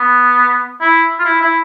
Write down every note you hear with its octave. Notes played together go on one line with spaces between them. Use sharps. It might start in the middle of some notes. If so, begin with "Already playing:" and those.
Already playing: B3
E4
F4
E4
E4